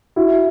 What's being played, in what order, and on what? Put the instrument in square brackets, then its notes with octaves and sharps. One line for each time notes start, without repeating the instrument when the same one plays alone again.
[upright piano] E4 F#4